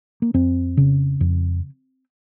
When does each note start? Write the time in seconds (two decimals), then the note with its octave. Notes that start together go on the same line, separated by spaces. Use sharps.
0.22 A#3
0.34 F2 C4
0.77 C#3
1.21 F2